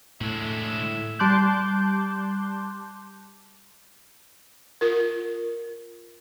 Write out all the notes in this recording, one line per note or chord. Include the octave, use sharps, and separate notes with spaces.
A2 D3 G#3 E5
G3 A5 C6 D6 F#6 G6
F4 A#4